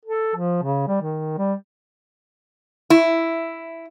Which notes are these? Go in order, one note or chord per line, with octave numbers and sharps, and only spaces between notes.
A4
F3
C#3
G3
D#3
G3
E4